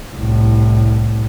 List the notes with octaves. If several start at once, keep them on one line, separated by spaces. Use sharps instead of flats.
C2 A2